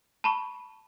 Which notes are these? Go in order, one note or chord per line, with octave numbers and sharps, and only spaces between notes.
A5 B5 C#6